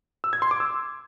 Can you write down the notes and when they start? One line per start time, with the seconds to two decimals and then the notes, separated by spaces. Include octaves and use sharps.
0.24 E6
0.33 G#6
0.42 C6
0.51 D6
0.60 E6